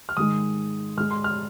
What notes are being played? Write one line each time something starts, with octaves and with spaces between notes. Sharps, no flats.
F6
G#2 D#3 G#3 D#6
G#2 G#3 F6
C6
F6